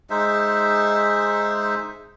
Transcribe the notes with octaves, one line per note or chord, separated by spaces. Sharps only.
G#3 D#4 C5 E5